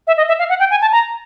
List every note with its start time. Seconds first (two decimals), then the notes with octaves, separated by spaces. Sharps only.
0.07 E5
0.17 D#5
0.28 E5
0.39 F5
0.49 F#5
0.60 G5
0.70 G#5
0.81 A5
0.92 A#5